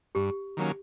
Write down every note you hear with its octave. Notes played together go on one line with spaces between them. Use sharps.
G2 G4
D#3 F#3 A#3 C#4